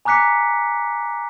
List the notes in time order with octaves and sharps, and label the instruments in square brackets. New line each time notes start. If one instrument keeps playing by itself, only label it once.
[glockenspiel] G#5 A#5 D6 F#6 B6 C#7